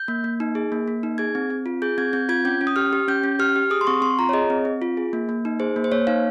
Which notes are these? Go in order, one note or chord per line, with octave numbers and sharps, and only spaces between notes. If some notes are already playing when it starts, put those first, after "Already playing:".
Already playing: G6
A#3
A#3
D#4
G#4
A#3
A#3
D#4
G#4 G#6
C4
C4
F4
G#4 G6
C4 G#6
C4 G6
F4 G#6
C#4 G6
C#4
D#6
G4 F6
G4
C#4 G6
C#4
G4 F6
G4
G#4 D#6
C6
C4 C#6
C4 C6
F4 A#5
C#5
G#4 D#5
C4
C4
F4
G#4
A#3
A#3
D#4
G#4 C5
A#3
C5
A#3 C#5
D#4 F5